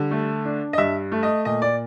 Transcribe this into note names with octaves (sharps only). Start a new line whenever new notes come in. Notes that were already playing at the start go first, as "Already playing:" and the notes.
Already playing: D3 G3
A3
D4
D#5
G2 E5
A3
D#5
A#2 D#5
D5